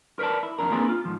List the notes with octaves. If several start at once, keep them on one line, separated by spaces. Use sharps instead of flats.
A#4 B4 C#5 D5 A5
E4
F2 G#2 D4 A#4
A#3 C4 D4 G#4 A#4 B4
F4
G#2 F3